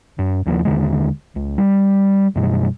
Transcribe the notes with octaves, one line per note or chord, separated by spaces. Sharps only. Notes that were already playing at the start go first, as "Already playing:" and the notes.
F#2
D#2 F3 A#3
D#2 D3 G#3
C#2
G3
F#2 B2 G3